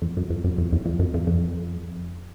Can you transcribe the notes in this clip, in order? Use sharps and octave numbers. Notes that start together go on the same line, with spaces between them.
F2
F#2
F2
F#2
F2
E2
F2
F#2
F2
F2